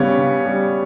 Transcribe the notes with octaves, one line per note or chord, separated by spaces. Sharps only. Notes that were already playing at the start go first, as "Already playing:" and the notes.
Already playing: C#3 G3 B3 C#5
C#3
G3